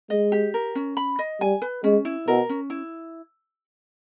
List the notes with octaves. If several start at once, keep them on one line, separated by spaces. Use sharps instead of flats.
G#3 D#5
G4
A#4
C#4
B5
D#5
G3 G#5
B4
G#3 C#4
E4
B2 A#4
C#4
E4